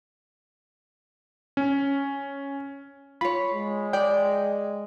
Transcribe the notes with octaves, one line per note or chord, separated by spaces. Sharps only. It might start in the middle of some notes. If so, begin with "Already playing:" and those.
C#4
F4 C#5 B5
G#3
D5 G5